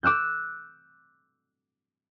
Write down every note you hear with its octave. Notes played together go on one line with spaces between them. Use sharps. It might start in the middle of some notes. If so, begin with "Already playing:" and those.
D6 E6 F#6 G6